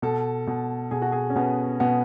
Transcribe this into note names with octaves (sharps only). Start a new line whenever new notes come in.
B2 A4
B2
B2 G#4
F#4
G#4
C#4
B2 B3
B2 B3